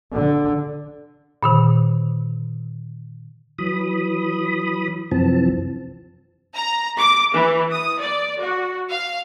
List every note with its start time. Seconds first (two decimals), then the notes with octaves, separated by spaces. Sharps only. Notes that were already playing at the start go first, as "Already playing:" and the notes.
0.13 D3
1.43 A#2 D3 D#3
3.59 E3 F#3 B5 D#6
5.11 F#2 C3 E3 F3 C4 A5
6.55 A#5
6.99 D6
7.34 E3
7.71 D#6
8.00 D5
8.40 F#4
8.90 F5